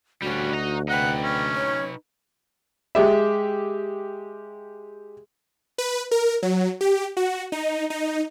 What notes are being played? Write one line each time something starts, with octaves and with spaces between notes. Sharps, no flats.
D2 G3 C#4 F#4
D#5 A#5
D#4 B4 F#5 G5
C#4
C#5
G#3 G4 E5
B4
A#4
F#3
G4
F#4
D#4
D#4